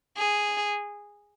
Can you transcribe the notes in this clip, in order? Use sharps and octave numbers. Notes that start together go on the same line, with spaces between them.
G#4